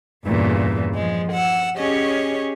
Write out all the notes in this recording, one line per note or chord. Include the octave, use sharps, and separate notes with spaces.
E2 G2 A#2 C#3 E3
F3 G#3
F#5 E6
C#4 G4 G#4 C#5 D#5